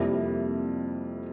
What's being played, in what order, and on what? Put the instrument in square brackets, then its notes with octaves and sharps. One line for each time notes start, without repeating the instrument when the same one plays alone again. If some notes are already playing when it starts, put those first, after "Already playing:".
Already playing: [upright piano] F2 C3 G3 A#3 E4